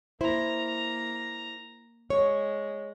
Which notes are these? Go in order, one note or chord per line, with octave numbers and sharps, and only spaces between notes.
A#3 E4 C5 A#5
G#3 C#5